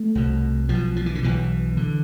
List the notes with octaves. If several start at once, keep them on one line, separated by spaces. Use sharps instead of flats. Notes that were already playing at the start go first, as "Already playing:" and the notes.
Already playing: A3
C2 B2
B1 B2 F3
F3
E3
D3
B1 B2 E3
D3